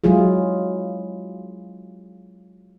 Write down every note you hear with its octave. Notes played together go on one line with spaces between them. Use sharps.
F#3 G#3 E4 F4 G#4